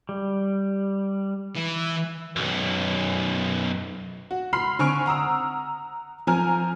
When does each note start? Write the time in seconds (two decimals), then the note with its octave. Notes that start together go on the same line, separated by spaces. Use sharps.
0.09 G3
1.56 E3
2.36 B1 F#2
4.31 F#4
4.53 B5 C6 F6 C7
4.79 D3 C4 G#5 C#6 F6 D7
5.06 F#5 A#5 D#6 E6
6.27 F3 C4 G#5 A#5 F6